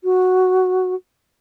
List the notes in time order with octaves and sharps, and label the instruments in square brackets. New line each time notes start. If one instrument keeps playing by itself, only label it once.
[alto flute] F#4